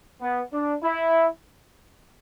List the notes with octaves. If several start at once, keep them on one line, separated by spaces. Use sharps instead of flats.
B3
D4
E4